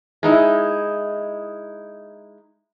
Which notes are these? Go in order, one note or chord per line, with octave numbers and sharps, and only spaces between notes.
G#3 D#4 E4